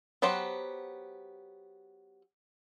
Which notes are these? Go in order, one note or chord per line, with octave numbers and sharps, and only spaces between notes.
F#3 B3 G4 C5 F#5